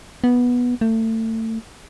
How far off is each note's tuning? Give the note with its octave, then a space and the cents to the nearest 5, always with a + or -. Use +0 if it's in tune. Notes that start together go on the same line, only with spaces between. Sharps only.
B3 -10
A3 +30